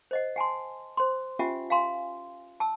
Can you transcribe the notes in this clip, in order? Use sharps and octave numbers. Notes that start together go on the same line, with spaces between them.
C5 D#5 F#5
F#5 G#5 A5 C6
C5 C6
C#4 F4 G4 E5 F#5 G#5
F5 G#5 A#5 C6
A5 E6